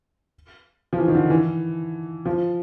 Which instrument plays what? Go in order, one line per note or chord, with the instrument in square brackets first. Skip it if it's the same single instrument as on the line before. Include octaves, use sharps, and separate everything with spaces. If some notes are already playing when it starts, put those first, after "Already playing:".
[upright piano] F3
E3
D#3
D3
E3
F3